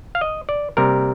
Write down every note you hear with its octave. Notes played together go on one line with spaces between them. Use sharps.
F5
D#5
D5
C3 G3 A#3 A#4